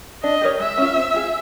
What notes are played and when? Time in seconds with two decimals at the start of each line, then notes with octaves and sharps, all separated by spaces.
0.23 D4 D#5
0.41 G4 A#4 C#5
0.60 G#3 E5
0.78 C#4 F4
0.96 C4
1.14 F4 G#4